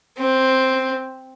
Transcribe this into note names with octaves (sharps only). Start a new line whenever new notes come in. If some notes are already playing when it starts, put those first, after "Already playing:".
C4